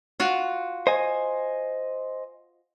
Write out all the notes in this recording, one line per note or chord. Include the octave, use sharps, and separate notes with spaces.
F4 F#4 F5
C5 D#5 G#5